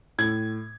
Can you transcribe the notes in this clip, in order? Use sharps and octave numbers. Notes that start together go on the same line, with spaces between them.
A2 G#6